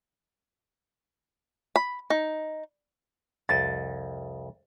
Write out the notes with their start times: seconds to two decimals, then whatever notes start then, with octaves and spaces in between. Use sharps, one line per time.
1.76 B5
2.10 D#4
3.49 C2 F2 A6